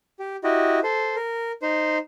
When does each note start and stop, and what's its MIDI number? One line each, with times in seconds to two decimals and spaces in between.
0.19 0.36 67
0.44 0.80 64
0.44 0.80 66
0.44 0.80 67
0.44 0.80 75
0.83 1.16 69
0.83 1.16 72
1.16 1.52 70
1.62 1.98 63
1.62 1.98 72